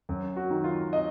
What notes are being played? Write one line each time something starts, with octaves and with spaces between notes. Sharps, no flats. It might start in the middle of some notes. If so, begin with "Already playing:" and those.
F#2
F#4
D#3 F#3
F4
D#5